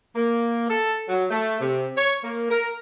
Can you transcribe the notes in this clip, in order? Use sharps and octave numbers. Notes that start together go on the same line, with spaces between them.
A#3
A4
F#3
A3
C3
C#5
A#3
A#4